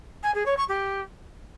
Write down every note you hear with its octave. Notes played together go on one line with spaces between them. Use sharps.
G#5
G#4
C#5
C#6
G4